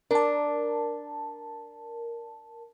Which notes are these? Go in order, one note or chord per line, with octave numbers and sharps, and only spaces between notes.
D4 A#4 A5